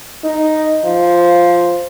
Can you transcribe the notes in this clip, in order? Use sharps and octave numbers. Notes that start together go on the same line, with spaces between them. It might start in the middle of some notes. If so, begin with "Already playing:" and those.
D#4
F3